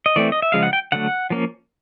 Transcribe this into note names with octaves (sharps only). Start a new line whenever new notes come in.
D#5
E3 A3 C4 D5
D#5
E5
C#3 F3 G#3 F5
F#5
G5
D3 F#3 A3 F#5
F3 A#3 C#4